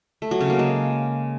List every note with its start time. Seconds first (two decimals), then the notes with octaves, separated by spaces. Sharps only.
0.22 A3
0.31 F#3
0.40 C#3
0.50 A#3
0.59 G#3